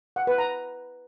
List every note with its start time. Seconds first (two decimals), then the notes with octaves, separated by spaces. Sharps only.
0.16 F#5
0.27 B4
0.38 A#5